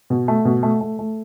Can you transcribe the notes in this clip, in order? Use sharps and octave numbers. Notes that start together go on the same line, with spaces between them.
B2
A3
B2
A3
A3
A3